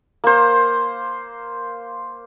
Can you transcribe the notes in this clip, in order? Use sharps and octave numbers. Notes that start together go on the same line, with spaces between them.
A#3 C5